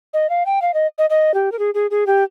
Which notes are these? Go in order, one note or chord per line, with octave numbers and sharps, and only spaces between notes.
D#5
F5
G5
F5
D#5
D#5
D#5
G4
A#4
G#4
G#4
G#4
G4